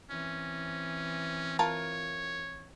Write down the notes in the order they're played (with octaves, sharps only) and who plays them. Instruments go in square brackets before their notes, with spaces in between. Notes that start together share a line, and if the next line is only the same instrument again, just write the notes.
[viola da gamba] E3 C4 [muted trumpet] C#4
[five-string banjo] F4 A#4 A5 [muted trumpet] C#5